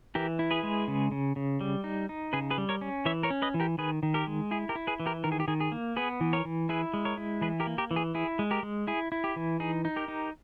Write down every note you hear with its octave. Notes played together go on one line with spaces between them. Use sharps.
E3 G4 A#4
E4
G#4 B4
G#3
C#3
C#3
C#3
G3
D#4
D#4
C#3 G#4 B4
G#4 B4
G3
A#4 C#5
C#4
E3 C#5 E5
A#4 C#5
C#4
B4 D#5
E3
G4 A#4
D#3 G#4 B4
D#3
G4 A#4
G#3
E4 G#4
G4 A#4
E4
G#4 B4
E3
G4 A#4
D#3 A#4
G#4
G4
D#3 G#4
G#4
A#3
B3 G#4 B4
E3
A#4 C#5
E3
E4 G#4 B4
G#3
A#4 C#5
E4
E3 G#4 B4
G4 A#4
A#3
G4 A#4
E3
G#4
E4 G#4
G#3
G4 A#4
G#3
E4 G#4
E4
G4
E3
D#4 G#4
D#4
G4 A#4
D#4